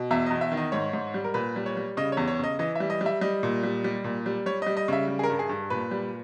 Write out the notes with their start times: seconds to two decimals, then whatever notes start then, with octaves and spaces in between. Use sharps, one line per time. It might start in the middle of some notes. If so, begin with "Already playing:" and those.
Already playing: B2
0.11 E2 E5
0.26 E2 D#5
0.41 E5
0.52 D#3
0.57 D#5
0.72 G#2 C#5
0.93 G#2
1.14 G3
1.24 A#4
1.34 A#2 B4
1.56 G3
1.66 C#5
1.77 G3
1.97 C#3 D#5
2.12 E2 C#5
2.28 C#5
2.39 C#3 D#5
2.59 E3 D#5
2.75 G3 E5
2.90 D#5
3.01 G3
3.06 E5
3.21 G3 D#5
3.43 A#2
3.63 G3
3.84 G3
4.04 A#2
4.26 G3
4.46 G3 C#5
4.62 G3 D#5
4.77 D#5
4.88 C#3 E5
5.08 G3
5.19 G#4
5.23 A#4
5.30 G2
5.39 G#4
5.49 G2
5.70 A#2 B4
5.91 G3